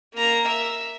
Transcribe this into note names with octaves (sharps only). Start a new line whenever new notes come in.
A#3 A#5
E5